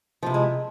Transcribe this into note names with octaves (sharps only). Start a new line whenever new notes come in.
C3 F3 G#3 E4